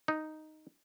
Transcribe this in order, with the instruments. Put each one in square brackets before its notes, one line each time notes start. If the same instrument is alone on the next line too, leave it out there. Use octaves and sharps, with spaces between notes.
[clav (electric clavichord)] D#4